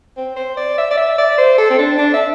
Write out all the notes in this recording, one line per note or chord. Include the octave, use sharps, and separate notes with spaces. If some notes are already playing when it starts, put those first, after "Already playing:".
C4
C5
D5
E5
D5
E5
D5
C5
A4
C4
D4
D4
E5